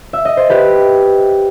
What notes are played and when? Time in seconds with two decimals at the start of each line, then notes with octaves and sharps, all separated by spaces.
0.13 E5
0.25 D#5
0.37 C5
0.49 G4 B4